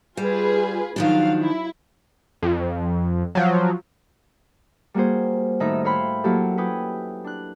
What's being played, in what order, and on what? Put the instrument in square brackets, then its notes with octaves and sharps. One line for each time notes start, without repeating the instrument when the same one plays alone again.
[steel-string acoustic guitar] G3 [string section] F4 G#4 B4
[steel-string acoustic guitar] D#3 F3 D4 [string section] F#3 F5
[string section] E4
[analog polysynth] F2
F3 F#3
[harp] G3 A#3 F#4 G#4 C5
A2 D#3 D#4 D#5 E5
C#5 E5 F5 G5 B5 C6
F#3 A#3 E4 F4 G4 A4
C#4 E4 G4 B4 G5 D#6
D4 F#6